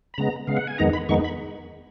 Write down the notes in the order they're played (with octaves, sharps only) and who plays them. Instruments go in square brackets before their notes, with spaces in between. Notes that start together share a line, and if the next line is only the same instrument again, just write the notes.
[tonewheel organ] B5
C#3 G#3 B3 A#5
C#3 G#3 B3 F5
F#5
G#5
F2 D#3 G#3 B3 D#4 A#5
B5
F2 D#3 G#3 B3 D#4 C#6
B5